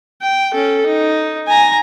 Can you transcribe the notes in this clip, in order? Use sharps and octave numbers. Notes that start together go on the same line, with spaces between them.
G5
C#4 A4
D#4
G#5 A#5